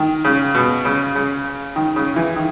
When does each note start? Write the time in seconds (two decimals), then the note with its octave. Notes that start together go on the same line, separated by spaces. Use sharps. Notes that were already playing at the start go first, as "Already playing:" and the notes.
Already playing: D#3
0.25 C#3
0.55 B2
0.85 C#3
1.15 C#3
1.76 D#3
1.96 C#3
2.16 E3
2.36 D#3